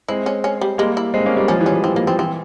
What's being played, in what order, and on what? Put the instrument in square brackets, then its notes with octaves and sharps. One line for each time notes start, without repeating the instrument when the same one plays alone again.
[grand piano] G#3 C4 [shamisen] E4
[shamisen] C#4
C#4
G3
[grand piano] G3 A#3 [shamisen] G#3
[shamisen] E4
[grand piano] G#3 C4
A#3 C#4
G3 A#3
[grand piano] F3 G#3 [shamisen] C#4
[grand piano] E3 G3
[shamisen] C#4
[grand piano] F3
[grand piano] E3 [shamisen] C4
[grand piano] F3 [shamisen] A#3
[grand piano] F3 [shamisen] C4
[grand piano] E3 [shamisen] C4